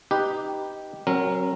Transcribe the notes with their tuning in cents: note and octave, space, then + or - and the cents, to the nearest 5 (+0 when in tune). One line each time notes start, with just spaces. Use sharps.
D#4 +0 G4 +0 B4 +0
F#3 +10 C#4 -45 A#4 +0